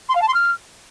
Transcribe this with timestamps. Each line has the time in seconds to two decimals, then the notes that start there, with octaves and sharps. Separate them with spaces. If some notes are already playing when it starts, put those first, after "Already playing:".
0.09 C6
0.15 F5
0.21 A5
0.28 C6
0.34 F6